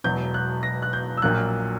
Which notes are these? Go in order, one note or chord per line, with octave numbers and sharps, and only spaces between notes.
E1 E2 B2 F#3 G6
F#6
A#6
F#6
G6
E6
A#1 A#2 F#3 A#3 F#6